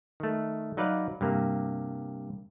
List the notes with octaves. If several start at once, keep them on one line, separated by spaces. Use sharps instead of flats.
D#3 A3
F#3 D#4 B4 D5 F5
G2 C3 A#3